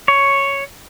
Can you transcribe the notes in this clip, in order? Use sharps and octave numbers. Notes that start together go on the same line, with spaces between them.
C#5